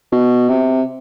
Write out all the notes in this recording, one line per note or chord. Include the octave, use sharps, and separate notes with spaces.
B2
C3